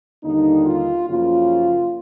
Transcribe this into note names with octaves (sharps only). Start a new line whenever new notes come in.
D#2 D3 G3 A#3 D#4
F4
F#2 C#3 F3 A#3 F4